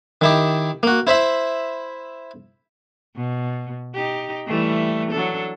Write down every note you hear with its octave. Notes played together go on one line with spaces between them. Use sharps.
D#3 E4 G4
A#3 F#4
E4 C5 E5 B5
B2
D#4 G4
E3 G3 A3
F#3 D4 A4